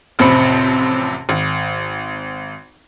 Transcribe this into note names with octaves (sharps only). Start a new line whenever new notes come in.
A1 F2 C3 C5 B5 C#7
G#1